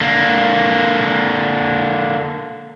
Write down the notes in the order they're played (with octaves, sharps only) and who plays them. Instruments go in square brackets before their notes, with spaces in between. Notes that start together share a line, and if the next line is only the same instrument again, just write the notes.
[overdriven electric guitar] D3 A#3